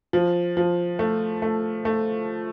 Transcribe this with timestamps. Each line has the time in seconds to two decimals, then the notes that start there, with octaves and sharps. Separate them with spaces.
0.13 F3
0.57 F3
0.99 A3
1.42 A3
1.85 A3